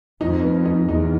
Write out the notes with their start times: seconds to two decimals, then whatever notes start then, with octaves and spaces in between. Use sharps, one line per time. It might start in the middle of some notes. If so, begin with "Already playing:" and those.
0.21 F2 D#4
0.43 B3
0.65 D#4
0.88 E2 D#4